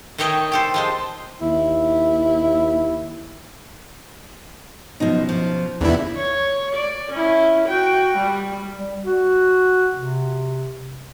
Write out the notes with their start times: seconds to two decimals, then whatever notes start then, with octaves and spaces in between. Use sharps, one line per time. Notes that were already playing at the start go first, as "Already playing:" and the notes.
0.18 D#3 A3 D#4 C#5 D#5 G5
0.52 G4 A4 C5
0.74 F3 G#3 C5
1.41 D#2 E4
5.00 F#2 B2 F3 D#4
5.29 F3
5.81 E2 C3 D#3 B3 D4 E4
6.16 C#5
6.75 D5
7.12 C#4 E4
7.68 F#4 G5
8.17 G3
8.76 G3
9.04 F#4
9.96 C3